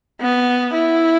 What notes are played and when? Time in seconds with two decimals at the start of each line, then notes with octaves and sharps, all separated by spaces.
0.21 B3
0.74 E4